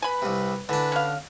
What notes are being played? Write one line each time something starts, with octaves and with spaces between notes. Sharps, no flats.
B4 G#5 B5
C2 C3
D3 E3 D4 B4
C#4 F5